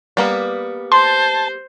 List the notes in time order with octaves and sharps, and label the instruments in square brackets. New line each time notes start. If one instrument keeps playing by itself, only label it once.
[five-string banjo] G3 A#3 B3
[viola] C5 [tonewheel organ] A5 [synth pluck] C6